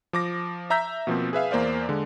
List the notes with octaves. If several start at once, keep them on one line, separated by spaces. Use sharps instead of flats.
F3 D6 A#6
E5 A#5 E6 G6 B6
B2 F3 A#3 C4
G#4 B4 E5 F5
E2 A#3 C5 D5 F5
D3 G#3